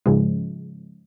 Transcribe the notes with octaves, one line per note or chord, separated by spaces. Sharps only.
G#2 C#3 F3 G#3